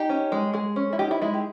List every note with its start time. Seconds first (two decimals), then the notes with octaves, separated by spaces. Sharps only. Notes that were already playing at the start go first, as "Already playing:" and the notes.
Already playing: D#4 G4
0.09 C#4
0.32 G#3
0.54 G#3 G#4
0.76 C#4
0.93 E4
0.99 D#4 G4
1.11 E4
1.22 G#3 E4
1.34 G4